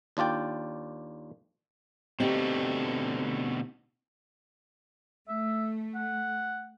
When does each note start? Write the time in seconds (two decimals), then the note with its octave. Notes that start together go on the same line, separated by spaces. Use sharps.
0.17 D#2 D4 F4 D5 G5
2.20 B2 D3 A3 C4 D#4 G4
5.28 A3 E5
5.95 F#5